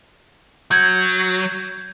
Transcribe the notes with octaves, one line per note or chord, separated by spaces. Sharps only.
F#3 G6 G#6